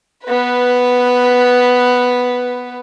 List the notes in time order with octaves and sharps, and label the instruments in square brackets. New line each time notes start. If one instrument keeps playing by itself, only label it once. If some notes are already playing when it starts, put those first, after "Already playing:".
[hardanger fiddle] B3 B4